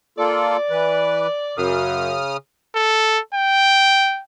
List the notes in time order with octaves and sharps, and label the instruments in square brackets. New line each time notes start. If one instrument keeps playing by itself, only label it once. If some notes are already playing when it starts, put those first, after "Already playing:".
[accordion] A#3 F4 A4 [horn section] D5
[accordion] E3 B4
[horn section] F#2 [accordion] C#3 D#6 F6
[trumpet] A4
G5